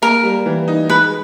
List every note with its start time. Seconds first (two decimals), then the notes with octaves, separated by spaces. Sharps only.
0.02 A#3 A#4
0.23 G3
0.46 E3
0.68 D#4
0.89 G#3 B4